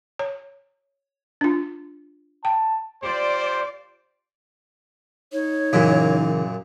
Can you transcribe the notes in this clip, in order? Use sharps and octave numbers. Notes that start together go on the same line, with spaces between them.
C#5
D4 F4
G5 A5
F4 G4 C5 D5
D#4 C#5
F#2 A#2 C#3 E3 D#5